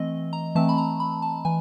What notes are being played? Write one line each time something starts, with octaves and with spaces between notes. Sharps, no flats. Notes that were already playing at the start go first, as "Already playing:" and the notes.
Already playing: E3 A3 C4 D#5
A#5
E3 A3 C4 A5
B5
A#5
B5
A5
E3 G#5